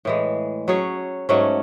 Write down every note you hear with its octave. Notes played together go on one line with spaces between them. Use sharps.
A2 E3 G#3
F#3 C#4 G#4 C#5
G#2 F#3 A3 C#4